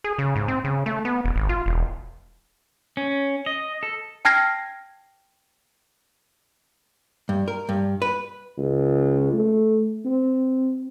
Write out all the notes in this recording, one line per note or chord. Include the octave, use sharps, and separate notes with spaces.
G#4
C#3
G#2
C4
C#3
A3
B3
E1
G#1
F4
E1
C#4
D#5
A4
G5 A5 F6 G#6 A#6 C7
G2
A#4
G2
B4
C#2
A3
C4